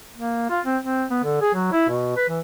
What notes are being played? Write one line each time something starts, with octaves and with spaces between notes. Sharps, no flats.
A#3
F4
C4
C4
B3
D3
G#4
F#3
E4
B2
B4
E3